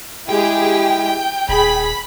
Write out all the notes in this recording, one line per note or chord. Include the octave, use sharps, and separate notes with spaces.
G#3 E4 G4 G#4 G5
D#1 G#4 B5